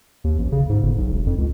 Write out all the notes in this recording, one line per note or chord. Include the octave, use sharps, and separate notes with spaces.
D#2
A1
C#3
G#2
G1
B1
E1
F2
C#2